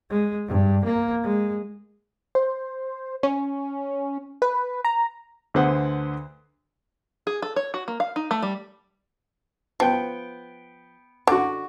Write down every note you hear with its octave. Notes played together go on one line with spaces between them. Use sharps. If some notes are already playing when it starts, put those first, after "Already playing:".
G#3
G2
A#3
G#3
C5
C#4
B4
A#5
D2 D3 G#4 B4 C5 F#5
G#4
A4
C#5
F#4
A#3
F5
D#4
A3
G3
F3 B3 G5
D3 F#4 D6